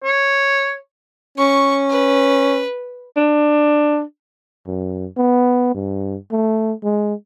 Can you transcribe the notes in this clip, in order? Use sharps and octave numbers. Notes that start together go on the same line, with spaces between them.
C#5
C#4 C#6
B4
D4
F#2
B3
G2
A3
G#3